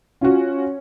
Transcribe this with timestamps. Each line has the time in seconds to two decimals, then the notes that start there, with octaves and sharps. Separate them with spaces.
0.21 C#4 F4 F#4